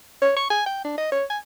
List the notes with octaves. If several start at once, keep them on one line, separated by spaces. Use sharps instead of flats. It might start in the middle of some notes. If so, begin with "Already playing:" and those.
C#5
C#6
G#5
G5
D4
D#5
C#5
G#5